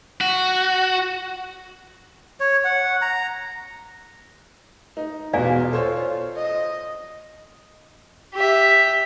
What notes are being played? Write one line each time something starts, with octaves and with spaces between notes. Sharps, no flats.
F#4
C#5
F#5
A#5
D#4
E2 B2 F4 D5 F5 G#5
A4 C5 C#5
D#5
G4 E5